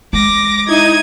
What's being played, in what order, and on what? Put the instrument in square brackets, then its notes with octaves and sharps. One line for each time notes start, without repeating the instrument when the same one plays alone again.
[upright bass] G#3 [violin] D6 A#6
[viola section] D#4 [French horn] E4 [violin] G#6 D#7